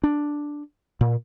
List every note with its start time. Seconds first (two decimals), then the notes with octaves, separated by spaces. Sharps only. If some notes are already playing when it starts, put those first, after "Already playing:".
0.03 D4
1.01 A#2